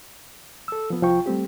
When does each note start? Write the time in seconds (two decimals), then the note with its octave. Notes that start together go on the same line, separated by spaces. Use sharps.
0.68 A4 E6
0.90 F3 B3
1.02 C2 F3 F4 G5 C#6
1.26 G3 A3 C4 G4